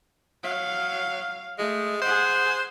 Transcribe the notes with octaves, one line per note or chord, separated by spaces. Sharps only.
F#3 F5
G#3 A3
G#4 C5 F#5